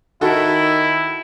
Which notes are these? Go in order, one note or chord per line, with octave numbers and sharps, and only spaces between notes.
D#3 E4 F#4 A4